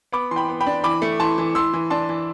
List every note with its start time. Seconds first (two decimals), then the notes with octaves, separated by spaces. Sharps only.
0.13 B3 B5 D6
0.31 E3 C6
0.36 G5 B5
0.48 B3
0.60 G5 B5
0.66 D4
0.84 E3 B5 D6
1.02 A3
1.20 E3 A5 C6
1.38 E3
1.55 E3 C6 E6
1.73 E3
1.90 D4 A5 C6
2.09 E3